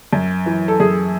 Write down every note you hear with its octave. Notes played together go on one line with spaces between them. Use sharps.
F#2
E3
A4
F#2 G#4